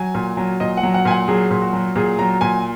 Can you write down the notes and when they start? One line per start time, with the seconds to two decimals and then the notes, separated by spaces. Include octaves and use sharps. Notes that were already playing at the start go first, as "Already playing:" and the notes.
Already playing: F#3 G#5
0.15 A#2
0.37 F#3
0.60 A#2 D#5
0.77 F#5
0.83 F#3
0.94 F#5
1.05 A#2 G#5
1.11 F#5
1.28 F#3 G#4
1.51 A#2
1.62 F#4
1.73 F#3
1.96 A#2 G#4
2.19 F#3 A#5
2.41 A#2 G#5